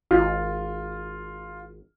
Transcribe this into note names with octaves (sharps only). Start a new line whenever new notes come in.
G#1 F4